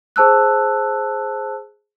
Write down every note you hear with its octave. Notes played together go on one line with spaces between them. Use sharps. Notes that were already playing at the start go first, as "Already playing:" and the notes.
G#4 C5 A5 E6 F#6